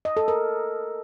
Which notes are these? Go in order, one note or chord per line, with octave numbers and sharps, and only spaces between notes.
D#5
A4
A#4